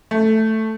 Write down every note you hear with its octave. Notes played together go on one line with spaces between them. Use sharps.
A3